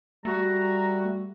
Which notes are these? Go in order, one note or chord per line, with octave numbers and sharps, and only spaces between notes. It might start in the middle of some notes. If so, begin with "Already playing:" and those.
G3 A3 F#4 A#5